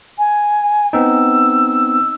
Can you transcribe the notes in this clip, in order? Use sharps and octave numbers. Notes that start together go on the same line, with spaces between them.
G#5
B3 C4 D#4 E6